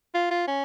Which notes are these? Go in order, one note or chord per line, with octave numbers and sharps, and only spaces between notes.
F4
F4
C#4